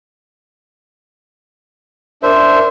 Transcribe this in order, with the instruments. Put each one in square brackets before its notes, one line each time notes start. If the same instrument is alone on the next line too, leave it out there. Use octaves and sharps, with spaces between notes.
[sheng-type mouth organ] D4 E5 [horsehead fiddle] A#4 [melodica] C5